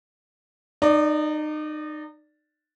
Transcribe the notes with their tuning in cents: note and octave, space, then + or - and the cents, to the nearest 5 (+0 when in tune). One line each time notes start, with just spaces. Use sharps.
D#4 -30 D5 +0